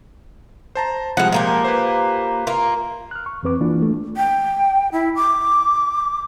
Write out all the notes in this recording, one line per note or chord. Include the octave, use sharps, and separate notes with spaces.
C5 A5 A#5
F3 G3 G#3 G#4 F#5
A#2 A#3 G4
B4 C5
A#3 F4
F6 F#6
C#6
F2 E3 C4 B4 D6
E3 A#3 D4 F4
A3
G5
E4
D6